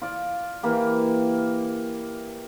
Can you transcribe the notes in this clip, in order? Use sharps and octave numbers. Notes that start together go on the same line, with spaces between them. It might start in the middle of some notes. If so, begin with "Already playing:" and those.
F4 D5
E3 A#3 G4